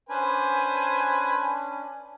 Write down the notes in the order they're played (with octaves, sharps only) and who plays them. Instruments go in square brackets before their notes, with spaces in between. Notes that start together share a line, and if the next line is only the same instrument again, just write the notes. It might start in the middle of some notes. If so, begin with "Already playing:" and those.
[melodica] C#4 D4 [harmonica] B4 C5 G#5